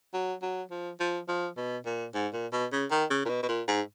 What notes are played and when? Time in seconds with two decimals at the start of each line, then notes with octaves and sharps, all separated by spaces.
0.14 F#3
0.42 F#3
0.71 F3
1.00 F3
1.28 F3
1.57 B2
1.86 A#2
2.14 G#2
2.33 A#2
2.52 B2
2.72 C#3
2.91 D#3
3.10 C#3
3.25 A#2
3.29 B2
3.43 B2
3.49 A#2
3.68 G#2